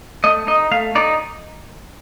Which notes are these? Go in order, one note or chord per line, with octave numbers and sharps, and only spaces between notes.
A3 D#5
D#4 D#5
A3 F5
D#4 D5